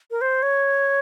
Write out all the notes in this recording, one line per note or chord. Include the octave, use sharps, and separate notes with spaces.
A#4
C5
C#5